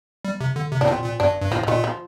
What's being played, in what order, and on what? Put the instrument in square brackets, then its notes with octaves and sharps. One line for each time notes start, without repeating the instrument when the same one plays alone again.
[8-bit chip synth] G3
C3
D3
C3
[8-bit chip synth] A2 [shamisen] D4
[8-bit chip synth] A#2 [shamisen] C4
[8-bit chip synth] A#2
[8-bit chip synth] G2 [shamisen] D4
[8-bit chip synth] G2
[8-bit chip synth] A2 [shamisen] F3
[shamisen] F3
[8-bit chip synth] A#2 [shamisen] D#3
[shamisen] F3